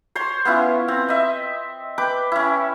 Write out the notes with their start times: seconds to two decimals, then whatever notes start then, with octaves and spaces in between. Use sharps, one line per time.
0.15 C5 C#5 C6
0.45 B3 C#4 E4 F4
0.88 C4
1.08 D#5 E5
1.98 B4 G5 D6
2.32 C#4 E4